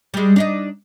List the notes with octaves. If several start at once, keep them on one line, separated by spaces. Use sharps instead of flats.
G3 G#3
D4 D#4 D#5